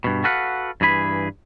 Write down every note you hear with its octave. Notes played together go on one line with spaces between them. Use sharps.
G2 B2
F#4 A4 B4 F5 F#5
G2 E3 G#4 B5